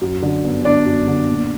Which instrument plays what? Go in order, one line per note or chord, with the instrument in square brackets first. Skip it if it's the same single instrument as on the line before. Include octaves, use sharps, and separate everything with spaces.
[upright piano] F#2
D3
G1
[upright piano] G1 [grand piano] D4 D5
[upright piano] F#2
D3
A#2